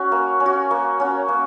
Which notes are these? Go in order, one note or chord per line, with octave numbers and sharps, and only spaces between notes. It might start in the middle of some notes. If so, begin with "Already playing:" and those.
Already playing: C#4 F#4
A#3
C#4
F#4
A#3
C#4 F#4
A#3